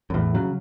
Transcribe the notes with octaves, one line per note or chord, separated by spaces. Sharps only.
F#2
E2 A2
C#3 F#3